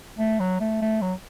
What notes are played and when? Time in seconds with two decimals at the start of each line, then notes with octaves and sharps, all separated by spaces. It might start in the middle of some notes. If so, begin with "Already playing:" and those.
0.18 A3
0.40 F#3
0.60 A3
0.81 A3
1.02 F#3